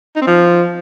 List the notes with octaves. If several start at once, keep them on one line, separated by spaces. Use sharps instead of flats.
D#4
C4
F3